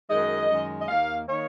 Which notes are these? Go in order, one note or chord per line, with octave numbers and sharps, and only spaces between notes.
F#2 D#3 G#3 D#5
F#2 D#3 G#3
D#5
D#2 D#3 A#3 F5
D#3 A#3 C#5